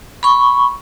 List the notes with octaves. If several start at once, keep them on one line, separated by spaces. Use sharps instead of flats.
B5 C#6